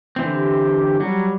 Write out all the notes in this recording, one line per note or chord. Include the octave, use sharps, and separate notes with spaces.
D3 E3 C4
G4
F#3 G3